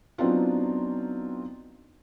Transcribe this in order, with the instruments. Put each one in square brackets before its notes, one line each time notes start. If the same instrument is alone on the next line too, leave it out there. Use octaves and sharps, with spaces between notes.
[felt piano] F#3 B3 C4 D4 D#4 F4